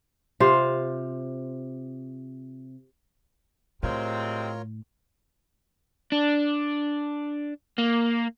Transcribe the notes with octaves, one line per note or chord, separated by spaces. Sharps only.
C3 F4 C5
A2 C3 G#3 C4 F4 A#4 C#5
D4
A#3